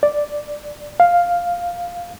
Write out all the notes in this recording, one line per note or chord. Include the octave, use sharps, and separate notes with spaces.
D5
F5